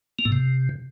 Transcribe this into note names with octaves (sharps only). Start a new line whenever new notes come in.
A#3
A2
C3